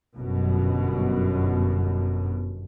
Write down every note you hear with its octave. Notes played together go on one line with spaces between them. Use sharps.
G1 F#2 B2